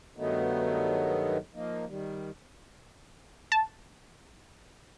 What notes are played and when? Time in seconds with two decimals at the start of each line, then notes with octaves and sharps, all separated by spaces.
0.16 G2 D#3 F#3 A3 B3 D#4
1.54 F3 A#3 D#4
1.87 D#3 G3
3.52 A5